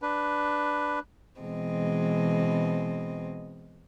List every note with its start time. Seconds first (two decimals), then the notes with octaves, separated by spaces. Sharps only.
0.02 D4 B4
1.38 B2 E3 G#3 C4 D#5